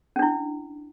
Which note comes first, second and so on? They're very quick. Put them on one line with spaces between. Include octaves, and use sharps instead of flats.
C#4 D4 E4